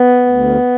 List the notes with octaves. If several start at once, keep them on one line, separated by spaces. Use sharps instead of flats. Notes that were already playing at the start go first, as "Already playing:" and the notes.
Already playing: B3
D2